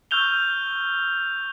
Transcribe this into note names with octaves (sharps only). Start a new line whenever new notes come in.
C#6 E6 F6 G6 F7 G7